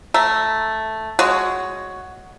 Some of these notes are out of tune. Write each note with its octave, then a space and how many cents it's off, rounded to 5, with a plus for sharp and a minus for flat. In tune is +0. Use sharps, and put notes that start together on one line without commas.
A3 +0 E5 +0 A#5 +0
G#3 +0 F#4 +0 C#5 +15